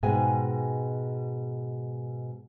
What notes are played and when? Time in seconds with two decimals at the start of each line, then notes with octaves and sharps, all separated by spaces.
0.03 G#2 B2 G#3 G5 G#5